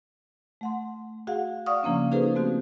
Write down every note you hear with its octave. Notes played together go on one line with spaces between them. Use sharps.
A3 F#5 C6
F#4 G#4 F5 F#5
D5 F5 F#5 C#6 D#6 F6
C#3 F3 A#3 C#4 D4
D#4 F#4 G#4 A4 B4 C5
A3 C4 F#4 G4